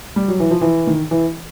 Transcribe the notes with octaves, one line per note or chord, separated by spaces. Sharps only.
G3
F#3
E3
F3
E3
D#3
E3